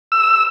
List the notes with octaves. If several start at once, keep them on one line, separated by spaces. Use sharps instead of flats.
E6